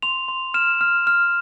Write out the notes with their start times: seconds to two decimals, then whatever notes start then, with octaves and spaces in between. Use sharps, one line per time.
0.02 C6 F7
0.29 C6
0.54 F6 E7
0.81 F6
1.07 F6